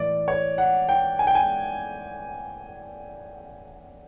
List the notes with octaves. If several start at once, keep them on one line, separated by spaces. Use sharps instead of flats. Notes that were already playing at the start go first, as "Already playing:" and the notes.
Already playing: A2 E3 A3 D5
C#5
F#5
G5
G#5
G5
G#5